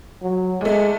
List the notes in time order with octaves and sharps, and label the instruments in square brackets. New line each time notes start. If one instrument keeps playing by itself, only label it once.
[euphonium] F#3
[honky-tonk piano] E2 A3 [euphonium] G#3